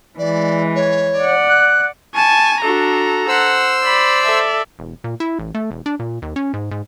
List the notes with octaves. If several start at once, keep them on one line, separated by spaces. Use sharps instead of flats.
E3 G#3 D5
C#5
D5 F#5
F#6
G#5 A5 C#6
D4 F#4 A4 A#5
C5 F#5 E6
D5 B5
A4 E5
E1
A#2
E4
A1
A3
E1
D4
A#2
D#2
C#4
G#2
G#2